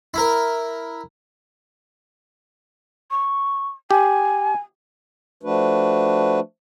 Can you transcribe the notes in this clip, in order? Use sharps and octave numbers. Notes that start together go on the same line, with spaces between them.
E4 A#4
C#6
G4 G#5
F3 A3 D4 F#4 B4